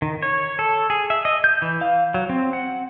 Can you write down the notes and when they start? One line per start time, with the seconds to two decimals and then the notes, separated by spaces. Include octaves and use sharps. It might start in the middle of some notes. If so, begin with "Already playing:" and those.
0.02 D#3
0.22 C#5
0.59 A4
0.90 G#4
1.10 E5
1.25 D#5
1.44 G6
1.62 E3
1.81 F5
2.14 F#3
2.29 C4
2.53 F#5